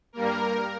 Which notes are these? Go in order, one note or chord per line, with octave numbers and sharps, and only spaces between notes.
G2 G3 A#3 A#4